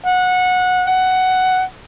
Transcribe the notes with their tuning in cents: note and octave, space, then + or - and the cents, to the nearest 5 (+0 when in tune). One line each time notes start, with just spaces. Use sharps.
F#5 -20
F#5 +10